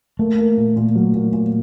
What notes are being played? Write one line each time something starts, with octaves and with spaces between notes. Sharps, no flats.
A3 A#3
A#3
A#2
A#2
F#3
A#2
A#2